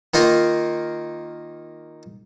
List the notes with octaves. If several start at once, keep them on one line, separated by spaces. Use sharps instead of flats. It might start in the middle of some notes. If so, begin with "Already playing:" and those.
D#3 A#3 D#4 F4 A#4